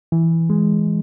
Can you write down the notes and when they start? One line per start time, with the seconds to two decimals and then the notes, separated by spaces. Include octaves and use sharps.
0.12 E3
0.50 G#3